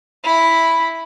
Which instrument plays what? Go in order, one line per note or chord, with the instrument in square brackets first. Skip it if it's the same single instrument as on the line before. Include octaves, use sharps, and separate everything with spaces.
[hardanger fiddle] E4 B5